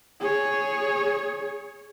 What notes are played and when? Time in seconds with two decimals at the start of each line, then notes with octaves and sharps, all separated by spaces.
0.20 G#4 C#5